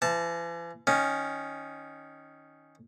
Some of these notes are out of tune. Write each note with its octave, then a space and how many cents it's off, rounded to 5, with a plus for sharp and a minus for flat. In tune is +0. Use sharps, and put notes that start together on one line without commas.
E3 +40 A5 +0
D#3 +0 C#4 +0